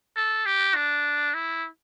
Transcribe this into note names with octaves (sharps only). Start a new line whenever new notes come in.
A4
G4
D4
E4